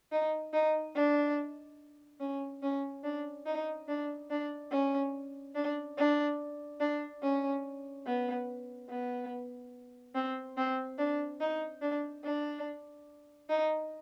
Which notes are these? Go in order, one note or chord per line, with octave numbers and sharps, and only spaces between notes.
D#4
D#4
D4
C#4
C#4
D4
D#4
D4
D4
C#4
D4
D4
D4
C#4
B3
B3
C4
C4
D4
D#4
D4
D4
D#4